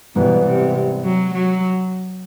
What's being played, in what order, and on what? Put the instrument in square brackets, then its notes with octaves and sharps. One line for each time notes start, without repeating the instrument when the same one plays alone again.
[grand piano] G#2 E3 G3 B3 [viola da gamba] B2
[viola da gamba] C3
F#3
F#3